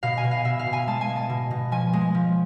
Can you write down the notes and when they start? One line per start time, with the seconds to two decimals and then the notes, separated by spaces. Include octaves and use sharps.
0.03 B2 F5
0.17 G#5
0.24 B2
0.31 F5
0.45 B2 E5
0.59 F5
0.66 B2
0.73 G#5
0.87 G#3 A5
1.01 G#5
1.08 G#3
1.16 A5
1.30 B2
1.51 B2
1.72 F3 G#5
1.93 G#3
2.15 F3